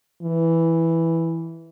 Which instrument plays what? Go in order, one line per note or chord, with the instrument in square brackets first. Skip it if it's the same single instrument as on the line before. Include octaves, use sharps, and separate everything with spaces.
[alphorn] E3